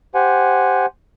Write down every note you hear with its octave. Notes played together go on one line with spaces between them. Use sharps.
G4 C5 F#5 G#5